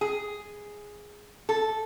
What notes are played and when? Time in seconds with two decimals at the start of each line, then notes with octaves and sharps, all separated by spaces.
0.01 G#4
1.49 A4